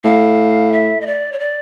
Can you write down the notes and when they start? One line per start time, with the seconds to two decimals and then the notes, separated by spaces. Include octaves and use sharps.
0.04 A2 F5
0.73 E5
1.01 D#5
1.07 D5
1.32 C#5
1.39 D5